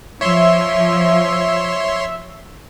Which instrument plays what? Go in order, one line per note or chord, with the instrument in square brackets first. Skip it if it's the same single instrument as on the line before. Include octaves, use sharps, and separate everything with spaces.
[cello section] F3 [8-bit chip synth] C#5 C6 [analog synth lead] E5